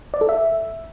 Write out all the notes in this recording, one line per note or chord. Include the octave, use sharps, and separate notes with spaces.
D5
A4
E5